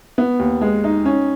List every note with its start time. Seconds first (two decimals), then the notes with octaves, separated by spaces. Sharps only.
0.18 B3
0.39 D#2
0.61 G#3
0.84 D#4
1.06 C#4